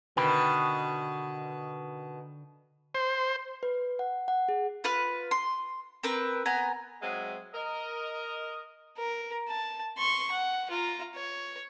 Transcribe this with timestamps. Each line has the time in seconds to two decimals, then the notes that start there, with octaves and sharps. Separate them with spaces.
0.17 B2 D3 D#3 G5 B5
2.95 C5
3.63 B4
3.99 F#5
4.28 F#5
4.49 G#4
4.84 F4 B4 F6 F#6
5.31 C6
6.03 C4 A#4 B4
6.46 B3 G#5 A#5
7.02 F#3 G#3 C4 F#4 G#4 E5
7.54 A#4 D#5
8.98 A#4
9.48 A5
9.98 C6 C#6
10.32 F#5
10.71 F4 A#5
11.15 C#5